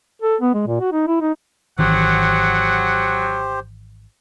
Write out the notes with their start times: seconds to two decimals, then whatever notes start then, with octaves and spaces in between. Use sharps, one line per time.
0.22 A4
0.41 B3
0.54 G#3
0.67 A#2
0.80 F#4
0.92 D#4
1.07 E4
1.21 D#4
1.79 G#1 D#3 E3 F#3 G4 C5 F#5